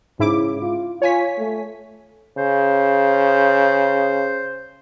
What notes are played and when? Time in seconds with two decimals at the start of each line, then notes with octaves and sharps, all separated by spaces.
0.19 G#2 C#3 E4 D6
0.62 F4
1.02 F4 C#5 G#5 B6
1.38 A3
2.38 C#3 C5